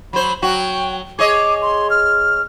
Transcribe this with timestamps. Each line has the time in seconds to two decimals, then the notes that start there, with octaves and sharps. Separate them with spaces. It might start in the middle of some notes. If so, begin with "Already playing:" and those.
0.13 F#3 C5 B5
0.42 F#3 F#4 G5
1.19 G#4 C#5 D#5 D6
1.62 C6
1.90 F6